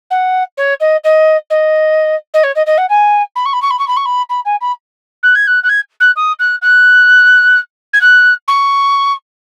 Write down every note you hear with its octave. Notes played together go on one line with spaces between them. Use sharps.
F#5
C#5
D#5
D#5
D#5
D#5
C#5
D#5
D#5
F#5
G#5
B5
C#6
B5
C#6
B5
C#6
B5
C#6
B5
B5
G#5
B5
F#6
G#6
F#6
F#6
G#6
F#6
D#6
F#6
F#6
G#6
F#6
C#6